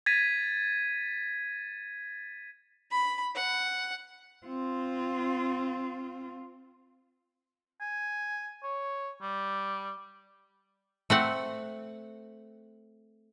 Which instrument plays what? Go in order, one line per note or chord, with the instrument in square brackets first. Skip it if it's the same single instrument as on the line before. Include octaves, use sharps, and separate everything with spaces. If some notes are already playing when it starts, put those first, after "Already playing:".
[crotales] G#6 A6 B6 D#7
[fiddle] B5
F#5
[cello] C4 F4
[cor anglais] G#5
C#5
G3
[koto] A3 C4 F#5